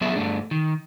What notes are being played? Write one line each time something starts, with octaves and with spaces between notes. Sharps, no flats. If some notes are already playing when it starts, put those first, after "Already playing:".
F#3 B3 C#4 G#4 E5
G2 A3 D4
D#3